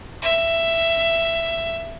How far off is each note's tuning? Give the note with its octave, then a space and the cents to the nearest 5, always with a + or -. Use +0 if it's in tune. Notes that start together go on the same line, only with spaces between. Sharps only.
E5 +10